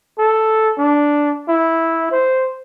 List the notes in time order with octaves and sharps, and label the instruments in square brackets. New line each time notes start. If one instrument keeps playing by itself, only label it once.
[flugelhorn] A4
D4
E4
C5